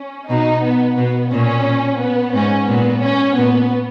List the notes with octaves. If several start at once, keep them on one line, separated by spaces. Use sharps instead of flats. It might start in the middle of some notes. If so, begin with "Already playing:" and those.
Already playing: C#4
B2 D#4
B3
B2 B3
A#2 C#4
B3
G#2 C#4
A#2 B3
C#4
A#2 B3